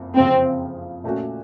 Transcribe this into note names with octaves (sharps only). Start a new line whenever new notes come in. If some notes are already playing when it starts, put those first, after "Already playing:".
Already playing: F#1 F2
F#1 F2 C#3 F3 C4
A#2 A3 C#4 F#4